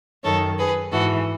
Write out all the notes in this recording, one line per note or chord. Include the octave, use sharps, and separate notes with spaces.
F#2 D#3 A4 C#5
G#4 B4
G#2 E3 F#4 A4